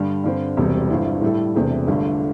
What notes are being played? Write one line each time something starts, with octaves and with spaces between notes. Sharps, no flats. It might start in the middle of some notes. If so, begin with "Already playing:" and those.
Already playing: G2 D3 G3
G2 D3 C4
E1 E2 C3 G3
G1 G2 D3 C4 E4
A2 G3 E4 A4
E1 E2 C3 A3 D4
G1 G2 D3 A3 D4